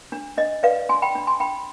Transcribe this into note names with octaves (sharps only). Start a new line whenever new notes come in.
D4
D4 D#5
B4 D5 F5
D4 G#5 C6
G5 B5
D4
G#5 C6
D4 G5 B5